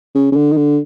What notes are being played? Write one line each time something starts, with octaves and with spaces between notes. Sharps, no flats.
C#3
C#3
D3
D#3
D3